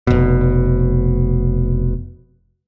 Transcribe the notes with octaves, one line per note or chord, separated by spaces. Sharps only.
F1 B2